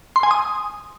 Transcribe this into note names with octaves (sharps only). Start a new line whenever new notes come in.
C6
G#5
D#6